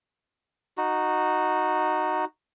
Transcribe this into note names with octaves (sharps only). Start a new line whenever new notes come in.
D#4 F#4